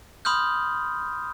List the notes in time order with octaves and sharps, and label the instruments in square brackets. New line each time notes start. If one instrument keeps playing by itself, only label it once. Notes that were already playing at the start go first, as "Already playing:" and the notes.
[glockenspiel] B5 C6 D#6 F6 G6